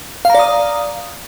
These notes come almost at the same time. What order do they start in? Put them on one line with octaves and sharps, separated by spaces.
F5 A#5 D5 D#6